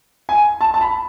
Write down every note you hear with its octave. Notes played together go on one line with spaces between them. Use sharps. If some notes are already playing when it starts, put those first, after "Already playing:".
G#5
A5
A5
B5